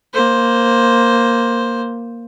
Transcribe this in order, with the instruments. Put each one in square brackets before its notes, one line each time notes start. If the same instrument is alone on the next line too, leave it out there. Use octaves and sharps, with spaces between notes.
[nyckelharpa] A#3 C5